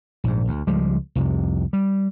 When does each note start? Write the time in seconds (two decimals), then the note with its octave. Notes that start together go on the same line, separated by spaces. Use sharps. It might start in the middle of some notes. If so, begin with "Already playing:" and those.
0.24 A#1 G#2
0.48 D2
0.67 C#2 F3 G3 G#3
1.15 C2 F2 C3
1.73 G3